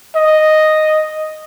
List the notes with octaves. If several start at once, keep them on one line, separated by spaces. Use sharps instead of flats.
D#5